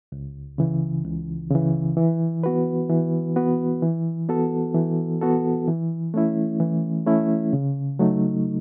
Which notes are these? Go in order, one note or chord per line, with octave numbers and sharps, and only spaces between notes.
C#2
C#3 E3
C#2
C#3 E3
E3
B3 F#4 B4
E3
B3 F#4 B4
E3
B3 F#4 A4
E3
B3 F#4 A4
E3
A3 C#4 E4
E3
A3 C#4 E4
C#3
F#3 A3 D#4